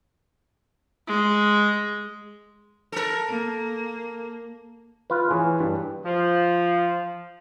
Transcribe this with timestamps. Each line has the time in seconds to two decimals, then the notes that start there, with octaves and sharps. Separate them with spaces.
1.07 G#3
2.92 A4 A#4
3.28 A#3
5.10 F4 B4
5.31 E3 G#4 C#5
5.60 G2
6.05 F3